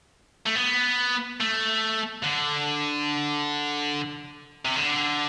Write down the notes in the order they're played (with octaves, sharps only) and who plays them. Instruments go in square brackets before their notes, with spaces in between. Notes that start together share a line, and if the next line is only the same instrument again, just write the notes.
[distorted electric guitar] A3
B3
A3
D3
C3
D3